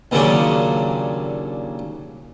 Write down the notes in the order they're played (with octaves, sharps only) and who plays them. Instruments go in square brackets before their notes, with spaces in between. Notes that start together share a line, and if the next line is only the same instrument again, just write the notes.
[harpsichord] D#2 A#2 C#3 F#3 C#4 D4